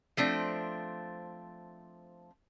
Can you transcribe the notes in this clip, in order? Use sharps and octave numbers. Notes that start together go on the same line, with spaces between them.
F3 A3 C4 D4